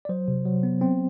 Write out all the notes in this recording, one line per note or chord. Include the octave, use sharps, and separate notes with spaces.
D5
F#3 C5
C3
F#3
B3
C4